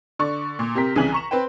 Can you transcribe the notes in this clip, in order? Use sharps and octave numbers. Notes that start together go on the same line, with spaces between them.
D3 D5 C#6
A#2
C3 G4 A#4 B6
C2 C#3 E3 G#5 F#7
A#5 C#6 E7
C4 B4 C5 G5